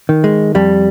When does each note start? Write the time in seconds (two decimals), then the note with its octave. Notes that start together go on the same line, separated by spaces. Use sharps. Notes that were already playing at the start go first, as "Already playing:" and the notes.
0.09 D#3
0.24 G#3
0.55 F2 G3